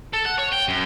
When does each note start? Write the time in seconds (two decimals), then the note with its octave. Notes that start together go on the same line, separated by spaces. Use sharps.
0.13 A4
0.25 F#5
0.38 C#5
0.52 G5
0.68 F#2